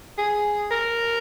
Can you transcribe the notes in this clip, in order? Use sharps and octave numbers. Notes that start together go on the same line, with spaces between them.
G#4
A#4